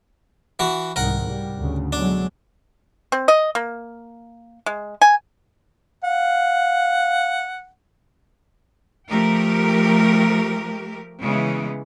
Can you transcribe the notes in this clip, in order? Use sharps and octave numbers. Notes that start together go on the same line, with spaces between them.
E3 F#4
C2 G#2 D#3 A#4 F#5
C2 G3
D2 C#3
B2 F#3 G#3 D4
C4
D#5
A#3
G#3
G#5
F5 F#5
F3 A3 G4 A#4
C#3 E3 G#3 B3